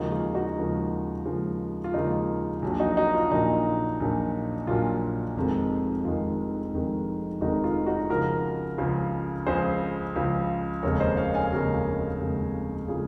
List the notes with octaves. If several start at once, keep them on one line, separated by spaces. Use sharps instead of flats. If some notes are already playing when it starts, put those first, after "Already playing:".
Already playing: D#2 C#3 F3 G#3 D#4 F#4
F4 G#4
D#4 F#4
D#2 C#3 F3 G#3
D#2 C#3 F3 G#3
F4
D#2 C#3 F3 G#3 D#4
A#1 A#2 F#3
D#4 F#4
D#4 F#4
F4
A#1 A#2 F#3 D#4
A#1 A#2 F#3
A#1 A#2 F#3 F4
F1 F2 D#3 G#3
F1 F2 D#3 G#3 F4
F1 F2 D#3 G#3
F1 F2 D#3 G#3 D#4 F#4
F4
D#4 F#4
C#2 C#3 F3 F#4 A#4
C#2 C#3 F3
C#2 C#3 F3 G#4 C5
C#2 C#3 F3
F1 D#2 C#3 G#3 A#4 C#5
C5 D#5
C#5 F5
F5 G#5
F1 D#2 C#3 G#3 F#4 A#4
F1 D#2 C#3 G#3
C#3 G#3 F4 G#4